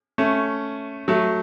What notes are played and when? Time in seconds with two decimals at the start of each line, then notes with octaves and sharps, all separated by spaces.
0.18 A3 C#4
1.08 F#3 A3